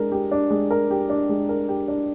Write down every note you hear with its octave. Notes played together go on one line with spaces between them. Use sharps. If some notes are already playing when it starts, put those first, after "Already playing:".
Already playing: G#3 D4 A#4
G4
D4
G#3
A#4
G4
D4
G#3
A#4
G4
D4